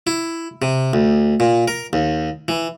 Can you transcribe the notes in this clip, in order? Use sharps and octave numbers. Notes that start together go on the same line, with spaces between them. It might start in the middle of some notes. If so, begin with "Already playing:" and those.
E4
C3
D2
A#2
A#4
D#2
E3